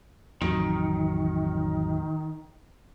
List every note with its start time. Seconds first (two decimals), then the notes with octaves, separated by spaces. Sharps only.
0.42 A1 F2 D#3 F#3